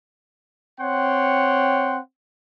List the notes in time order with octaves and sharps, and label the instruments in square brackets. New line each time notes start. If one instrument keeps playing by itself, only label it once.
[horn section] C4 C#5 F#5 G5 C6